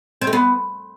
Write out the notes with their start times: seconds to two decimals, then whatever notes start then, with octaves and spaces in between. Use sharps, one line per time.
0.21 C4
0.27 A3
0.33 B3